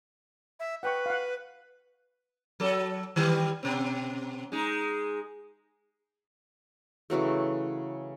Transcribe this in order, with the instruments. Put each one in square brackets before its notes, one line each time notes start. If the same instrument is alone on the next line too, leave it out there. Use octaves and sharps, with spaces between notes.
[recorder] E5
[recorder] B4 [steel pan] F#5 G5 C#6
[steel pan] F5 F#5
[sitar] F#3 A4
D#3 E3 G3
B2 C4
G#3 D#4
[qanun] C#3 E3 F#3 A3